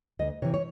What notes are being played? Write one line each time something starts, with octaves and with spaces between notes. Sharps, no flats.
D2 D#5
C3 E3 C#5
C#5